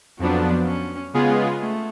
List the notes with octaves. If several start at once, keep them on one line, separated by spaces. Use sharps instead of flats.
F2 F3 F#3 B3 D4
C#4
C#3 G#3 B3 F4 G#4
A3